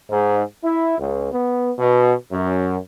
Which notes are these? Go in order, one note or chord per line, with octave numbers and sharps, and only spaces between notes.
G#2
E4
C#2
B3
B2
F#2